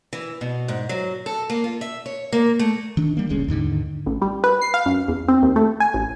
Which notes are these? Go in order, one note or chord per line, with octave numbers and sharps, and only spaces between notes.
E3
B2
G#2
F#3
A4
A#3
F4
E5
C#5
A#3
A3
D#3 D4
G3 A#3
E1 C2 G#3 C#4
D#2 G#2 D3 D#3
A1
G3
B4
C7
F5
F#2
E2
C4
D#2
A3
G#5
A1